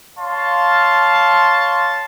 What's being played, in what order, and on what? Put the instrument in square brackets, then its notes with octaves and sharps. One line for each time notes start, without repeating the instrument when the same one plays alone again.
[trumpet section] C#5 F5 A5 C6